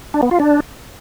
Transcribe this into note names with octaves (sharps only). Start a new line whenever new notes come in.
D4
B3
F4
D4